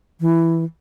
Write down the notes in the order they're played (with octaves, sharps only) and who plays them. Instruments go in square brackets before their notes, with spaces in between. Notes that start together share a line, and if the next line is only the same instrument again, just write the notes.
[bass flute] E3